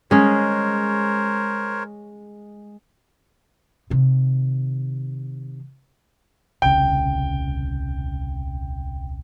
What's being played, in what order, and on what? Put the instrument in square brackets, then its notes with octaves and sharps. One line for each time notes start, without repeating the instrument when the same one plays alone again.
[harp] G#3 [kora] C#4 G#4 [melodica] A#4 C5 C#5
[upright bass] C3 D#3
[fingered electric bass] D#1 C2 C#3 [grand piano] G5